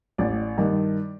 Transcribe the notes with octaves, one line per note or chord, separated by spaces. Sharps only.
A1 D5
G2 D#3